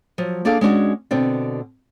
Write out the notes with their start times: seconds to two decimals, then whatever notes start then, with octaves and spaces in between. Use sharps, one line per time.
0.18 F3 F#3
0.45 A#3 D4 G#4 A4 F5
0.61 G#3 C#4 D4 F#4
1.11 B2 D3 C4 D4